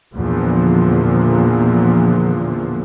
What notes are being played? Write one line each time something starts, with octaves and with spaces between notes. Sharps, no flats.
E2 A#2 D3 F3